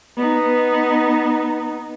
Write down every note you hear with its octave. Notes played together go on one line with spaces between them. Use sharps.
B3 D#4